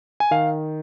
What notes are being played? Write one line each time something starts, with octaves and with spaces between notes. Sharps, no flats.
G#5
D#3 F5